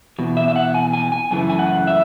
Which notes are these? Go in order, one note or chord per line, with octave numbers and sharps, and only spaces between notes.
E2 B2
E5
E5
F#5
G#5
G#5
G#5
F#2 C#3 E3 A3 G#5
G#5
F#5
E5